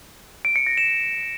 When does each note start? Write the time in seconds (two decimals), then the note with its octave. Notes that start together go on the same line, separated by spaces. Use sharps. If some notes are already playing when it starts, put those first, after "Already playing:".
0.45 D7
0.56 C#7
0.67 A#6
0.77 E7